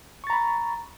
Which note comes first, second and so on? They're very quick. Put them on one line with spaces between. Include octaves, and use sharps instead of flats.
C#6 A6 A#5 B5